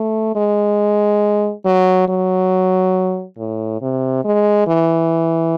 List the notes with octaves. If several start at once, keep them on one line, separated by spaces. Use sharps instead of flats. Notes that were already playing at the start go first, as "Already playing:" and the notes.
Already playing: A3
G#3
F#3
F#3
A2
C3
G#3
E3